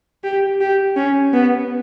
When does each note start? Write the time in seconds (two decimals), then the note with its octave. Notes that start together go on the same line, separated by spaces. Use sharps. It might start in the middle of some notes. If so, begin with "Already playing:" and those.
0.24 G4
0.61 G4
0.97 C#4
1.33 B3